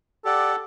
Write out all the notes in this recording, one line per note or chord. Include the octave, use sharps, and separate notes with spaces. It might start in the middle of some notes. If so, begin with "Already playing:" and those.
G4 A4 D5 F#5